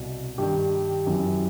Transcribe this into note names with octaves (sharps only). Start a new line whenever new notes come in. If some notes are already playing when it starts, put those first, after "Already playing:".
Already playing: C2 B2
G2 D#3 G4
F#2 E3